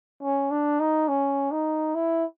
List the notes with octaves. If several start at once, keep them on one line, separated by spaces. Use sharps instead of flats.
C#4
D4
D#4
C#4
D#4
E4